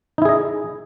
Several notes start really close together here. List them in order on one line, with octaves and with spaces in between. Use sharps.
D#4 E4 G#4 D#5